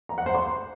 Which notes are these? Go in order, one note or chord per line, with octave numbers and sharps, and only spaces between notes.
A#5
F#5
C5
C6